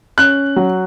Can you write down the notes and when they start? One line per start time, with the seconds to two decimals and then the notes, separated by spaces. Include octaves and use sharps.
0.18 C#4 F#6
0.56 F#3